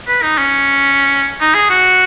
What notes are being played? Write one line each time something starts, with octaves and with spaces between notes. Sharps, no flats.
B4
D#4
C#4
D#4
G#4
F#4